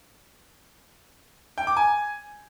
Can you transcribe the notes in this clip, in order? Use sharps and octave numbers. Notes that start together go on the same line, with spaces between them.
G5
D6
G#5